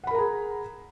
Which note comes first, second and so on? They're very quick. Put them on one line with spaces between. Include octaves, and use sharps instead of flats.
F#5 B5 A#4 A#5 G#4